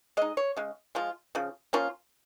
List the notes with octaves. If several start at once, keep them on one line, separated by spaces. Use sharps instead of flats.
G#3 D#4 D#5
C#5
C#3 G#3
F3 G#3 F4
C#3 F3
F3 A#3 C#4 F4